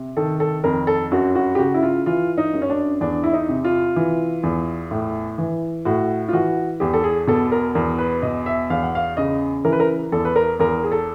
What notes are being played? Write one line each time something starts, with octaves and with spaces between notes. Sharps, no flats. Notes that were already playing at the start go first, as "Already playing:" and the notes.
Already playing: C3
D#3 A4
A4
F2 A#4
A4
F#2 F#4
F#4
G4
C#3 F#4
E4
F4
E3 F4
D#4
F#2
C#4
D4
E2 D4
E4
D#4
C3
F4
E3
E2
A2
E3
A2 F#4
F4
E3 F#4
E2 G4
A4
G#4
B2 A4
A#4
E2 A#4
B4
B2 D#5
E5
E2 F5
F#5
F5
C#3 D#5
E3 A#4
B4
A#4
E2 A4
B4
A#4
E2 A#4
G#4
A4